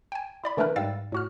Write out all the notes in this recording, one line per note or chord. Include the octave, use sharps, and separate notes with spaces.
G5 G#5
E4 D5 B5
D3 E3 A3 D4 A#4 B4
G#2 G3 F5 G5 E6 A6
A2 F#4 F6